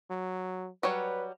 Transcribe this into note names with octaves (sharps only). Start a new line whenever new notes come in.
F#3
F#3 G3 B4 C#5